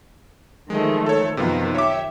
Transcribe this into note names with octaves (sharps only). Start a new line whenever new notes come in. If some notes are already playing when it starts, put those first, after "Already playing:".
D#3 F3 G#3 A3 D#5
A4 C#5
F#2 C3 D#3 F3 B3 F4
G4 C#5 E5 D6